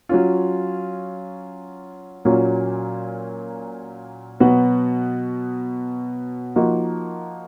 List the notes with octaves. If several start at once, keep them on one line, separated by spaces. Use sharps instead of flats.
F#3 C#4 F4
A#2 F#3 A#3 C#4 F4
B2 F#3 B3 F#4
F3 A#3 D#4 F#4